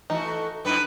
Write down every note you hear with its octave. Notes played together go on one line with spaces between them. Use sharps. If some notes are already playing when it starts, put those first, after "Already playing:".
E3 A3 D#4 F#4
F#2 D#4 E4 B4